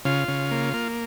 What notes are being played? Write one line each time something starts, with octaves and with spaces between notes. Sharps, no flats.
C#3 F4
C#3
A#3
A#3